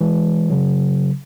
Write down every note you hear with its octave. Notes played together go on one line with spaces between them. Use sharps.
E3 G#3
C#3 F#3